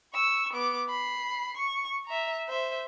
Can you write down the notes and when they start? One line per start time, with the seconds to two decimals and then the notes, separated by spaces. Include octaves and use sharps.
0.14 C#6 E6
0.53 B3 D6
0.89 B5 C7
1.58 C#6
2.06 E5 A#5
2.48 C5 E5